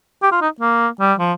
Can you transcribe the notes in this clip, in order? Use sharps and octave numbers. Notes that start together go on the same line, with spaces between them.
G4
F4
D#4
A#3
G3
F3